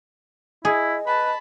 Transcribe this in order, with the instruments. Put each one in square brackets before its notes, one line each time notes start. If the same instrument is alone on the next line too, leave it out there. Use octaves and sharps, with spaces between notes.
[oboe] E4 [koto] G#4 [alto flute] D#5
[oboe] B4 [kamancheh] A5 B5